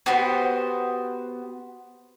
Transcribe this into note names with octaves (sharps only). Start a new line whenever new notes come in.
B3 F#4 G4 C5